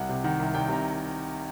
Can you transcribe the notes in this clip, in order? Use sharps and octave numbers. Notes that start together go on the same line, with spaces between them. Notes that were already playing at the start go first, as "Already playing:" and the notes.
Already playing: C2 F#5
C3
D#3 F#5
C2
C2 G5
C3 A#5